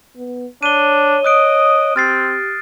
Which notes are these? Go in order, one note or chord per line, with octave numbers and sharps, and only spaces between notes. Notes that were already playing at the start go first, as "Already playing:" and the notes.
B3
D4 C#5 D#7 G7
D#5 D#6 F#6 D7
C4 G4 F6 A6 C7